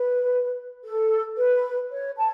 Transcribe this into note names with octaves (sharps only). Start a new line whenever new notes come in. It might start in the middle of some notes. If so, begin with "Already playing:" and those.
Already playing: B4
A4
B4
C#5
A5